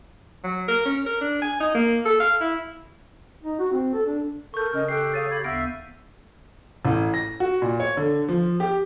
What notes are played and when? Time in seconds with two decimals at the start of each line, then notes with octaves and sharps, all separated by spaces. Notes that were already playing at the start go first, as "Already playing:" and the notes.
0.44 F#3
0.68 A#4
0.85 C#4
1.06 A#4
1.21 D4
1.42 G#5
1.60 D#4
1.74 A#3
2.05 A4
2.20 F5
2.41 E4
3.43 D#4
3.59 F#4
3.72 C4
3.94 A4
4.06 D4
4.54 A4 A#4 C#6 G6
4.73 C#3 C#4 D#5
4.88 G4 A4 G5 F#6 C7
5.14 G#4 C#5 F5 A6 D#7
5.29 G4 B5 G#6
5.44 D2 B3 E5 F5 E6 A#6
6.85 A1
7.14 A#6
7.40 F#4
7.62 A#2
7.80 C#5
7.97 D3
8.28 F3
8.60 G4